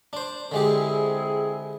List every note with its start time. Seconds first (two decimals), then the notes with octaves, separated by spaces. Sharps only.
0.13 D4 C5
0.51 D3 G#3 C4 E4 G4 G#4